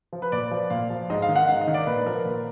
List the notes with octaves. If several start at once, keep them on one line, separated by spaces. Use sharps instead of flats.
F3
B4
A#2 D5
F3
A#2 F5
F3
G#2 D#5
F5
D#3
F#5
G#2 F5
D#5
D#3
D5
A#2 B4
F3 A#4
A#2